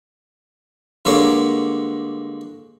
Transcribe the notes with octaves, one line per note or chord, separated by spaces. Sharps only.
G2 D3 G#3 A#3 C#5 D5